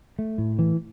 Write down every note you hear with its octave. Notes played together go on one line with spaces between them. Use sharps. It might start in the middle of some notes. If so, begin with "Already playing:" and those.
A3
A2
E3